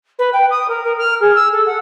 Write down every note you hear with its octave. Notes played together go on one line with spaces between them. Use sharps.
B4
G5
D#6
A#4
A#4
F6
G#4
E6
A4
F#5